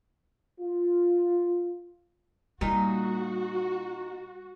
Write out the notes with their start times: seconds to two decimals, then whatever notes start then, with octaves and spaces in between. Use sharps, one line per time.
0.60 F4
2.61 A#2 G3 D#4 F#4